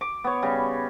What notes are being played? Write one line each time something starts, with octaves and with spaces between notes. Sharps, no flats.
D6
B3 C#5
C#3 G3